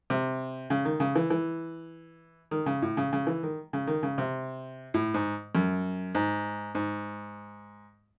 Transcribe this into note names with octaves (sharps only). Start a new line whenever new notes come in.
C3
C#3
D#3
C#3
E3
E3
D#3
C#3
A2
C#3
C#3
E3
D#3
C#3
D#3
C#3
C3
A2
G#2
F#2
G#2
G#2